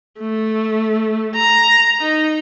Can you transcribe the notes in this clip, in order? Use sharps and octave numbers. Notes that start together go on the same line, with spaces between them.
A3
A#5
D#4